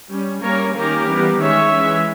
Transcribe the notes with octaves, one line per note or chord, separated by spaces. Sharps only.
G3 C#4
G3 A#3 C#4 A#4 C#5
D#3 A#3 C#4 G4 A#4
E3 G3 B3
D#3 G#3 C#4 C#5 E5
E3 G#3 C#4